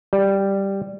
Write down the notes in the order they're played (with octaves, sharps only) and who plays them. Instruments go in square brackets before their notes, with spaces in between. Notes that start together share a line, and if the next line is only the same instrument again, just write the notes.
[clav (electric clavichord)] G3